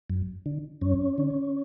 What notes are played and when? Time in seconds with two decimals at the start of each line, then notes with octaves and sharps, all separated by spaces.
0.10 F#2
0.46 D3
0.81 F#2 C#4
1.18 D3